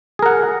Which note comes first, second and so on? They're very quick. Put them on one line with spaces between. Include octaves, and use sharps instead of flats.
G#4 A#4 F#5